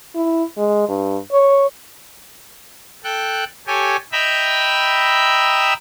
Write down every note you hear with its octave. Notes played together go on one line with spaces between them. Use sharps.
E4
G#3
G2
C#5
A4 G5 F#6
G4 A4 C#5 G#5
D#5 E5 G5 A#5 B5 E6